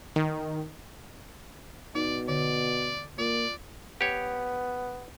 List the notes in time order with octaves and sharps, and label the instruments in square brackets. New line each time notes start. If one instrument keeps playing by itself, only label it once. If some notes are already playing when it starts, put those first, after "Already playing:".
[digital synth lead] D#3
[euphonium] B2 [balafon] D#4 [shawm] D5
[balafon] D3 [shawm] D5
[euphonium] A#3 [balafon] F4 [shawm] D5
[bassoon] B3 [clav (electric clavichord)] G4 C#5